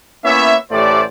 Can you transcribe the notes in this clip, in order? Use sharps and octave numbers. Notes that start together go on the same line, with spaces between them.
A#3 B3 C#4 E4 C#5 E5
A1 A2 A3 G4 C5 D5